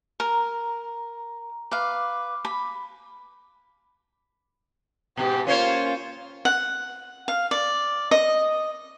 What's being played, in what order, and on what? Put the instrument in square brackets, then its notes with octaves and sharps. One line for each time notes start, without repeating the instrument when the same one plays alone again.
[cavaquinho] A#4 [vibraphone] A#5
[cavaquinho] B4 F5 [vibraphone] D6
[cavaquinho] B5
[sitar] G#2 B2 [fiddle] G4
[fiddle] A#3 F4 [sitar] C#4 C5 C#5
[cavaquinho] F#5
F5
D5
D#5